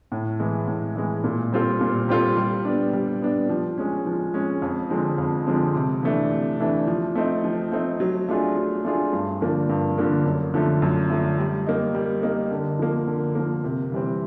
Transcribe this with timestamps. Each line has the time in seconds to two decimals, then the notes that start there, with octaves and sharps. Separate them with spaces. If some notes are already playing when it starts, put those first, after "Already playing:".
0.12 A2
0.40 E3 G#3
0.67 A2
0.96 E3 G#3
1.24 A#2
1.53 G3 C4 F4 A4
1.81 A#2
2.09 G3 C4 F4 A4
2.37 G3
2.65 B3 D4
2.93 G3
3.22 B3 D4
3.49 F3
3.78 G#3 C#4
4.06 F3
4.34 G#3 C#4
4.62 F2
4.90 D3 F3 G#3 C4
5.18 F2
5.47 D3 F3 G#3 C4
5.75 C3
6.03 E3 A3 D4
6.31 C3
6.60 E3 A3 D4
6.88 F3
7.15 A3 C4 D#4
7.44 F3
7.72 A3 C4 D#4
8.00 F#3
8.29 A3 D4 F4 G#4
8.57 F#3
8.85 A3 D4 F4 G#4
9.13 G2
9.41 D3 F3 A#3 D4
9.69 G2
9.98 D3 F3 A#3 D4
10.25 F#2
10.54 D3 F3 A3
10.82 F#2
11.10 D3 F3 A3
11.38 G3
11.67 A#3 D#4
11.95 G3
12.23 A#3 D#4
12.51 D3
12.79 F3 A#3
13.07 D3
13.35 F3 A#3
13.64 C3
13.92 E3 G3 C4